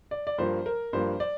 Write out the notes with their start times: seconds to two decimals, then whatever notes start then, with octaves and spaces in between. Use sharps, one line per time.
0.11 D5
0.27 D5
0.38 G2 F3 A#3 C5
0.66 A#4
0.93 G2 F3 A#3 C5
1.20 D5